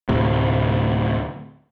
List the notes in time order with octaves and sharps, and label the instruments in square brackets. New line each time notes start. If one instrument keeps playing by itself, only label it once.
[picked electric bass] D2 A2 C3